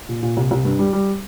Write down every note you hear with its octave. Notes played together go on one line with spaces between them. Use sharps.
A#2
A#2
C2
C2
G2
G3
G3